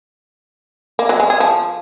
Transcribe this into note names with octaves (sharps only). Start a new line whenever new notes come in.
A#3
F#3
G#3
G#4
F3